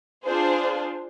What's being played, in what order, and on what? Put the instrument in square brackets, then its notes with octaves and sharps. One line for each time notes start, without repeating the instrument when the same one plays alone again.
[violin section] D4 F4 G#4 C5